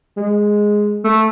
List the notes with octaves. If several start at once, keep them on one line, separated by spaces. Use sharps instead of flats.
G#3
A3